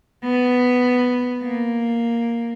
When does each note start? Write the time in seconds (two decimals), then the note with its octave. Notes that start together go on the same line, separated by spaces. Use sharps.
0.23 B3
1.44 A#3